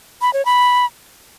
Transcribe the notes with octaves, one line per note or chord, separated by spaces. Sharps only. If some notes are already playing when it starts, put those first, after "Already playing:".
B5
C#5
B5